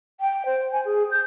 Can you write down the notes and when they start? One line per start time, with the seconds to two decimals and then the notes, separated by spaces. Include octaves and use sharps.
0.21 G5
0.46 C5
0.72 G#5
0.85 G#4
1.11 G6